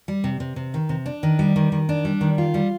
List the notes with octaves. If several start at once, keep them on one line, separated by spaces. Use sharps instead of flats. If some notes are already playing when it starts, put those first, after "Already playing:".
G3
C3
C3
C3
D#3
C3
D4
D#3
G3
D#3
D#3
D4
G3
D#3
F4
G3